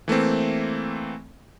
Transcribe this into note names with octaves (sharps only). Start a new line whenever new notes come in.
E3 A3 A#3 C4